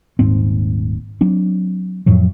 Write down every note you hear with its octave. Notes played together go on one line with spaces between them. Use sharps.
D#1 D#2 G#2 C4
F#3 C4 D4
F2 A2 F3 F#3